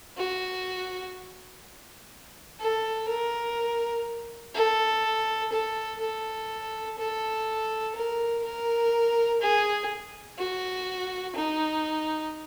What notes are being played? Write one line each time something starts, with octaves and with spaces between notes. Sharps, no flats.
F#4
A4
A#4
A4
A4
A4
A4
A#4
A#4
G#4
F#4
D#4